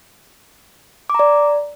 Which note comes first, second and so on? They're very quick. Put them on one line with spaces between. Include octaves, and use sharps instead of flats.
D6 A#5 D5